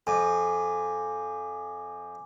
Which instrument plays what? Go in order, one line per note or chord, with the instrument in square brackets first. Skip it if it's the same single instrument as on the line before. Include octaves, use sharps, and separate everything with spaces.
[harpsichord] F2 [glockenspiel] G#5 D6